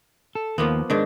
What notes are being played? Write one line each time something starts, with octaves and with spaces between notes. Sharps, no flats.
A4
D#2 F3 A#3 B3
G#2 D#3 D4